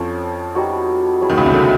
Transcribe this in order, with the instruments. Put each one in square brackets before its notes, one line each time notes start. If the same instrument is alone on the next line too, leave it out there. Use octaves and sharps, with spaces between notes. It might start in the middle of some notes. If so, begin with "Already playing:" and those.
Already playing: [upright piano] F2 F3 [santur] C#4 F4 A4
[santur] G3 B3 D#4 F#4
F#3 B3 E4 G#4
[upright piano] D#2 D#3
C#2 C#3
C2 C3
D3